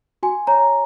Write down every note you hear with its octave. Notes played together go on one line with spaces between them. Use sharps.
F#4 G#5
C#5 A#5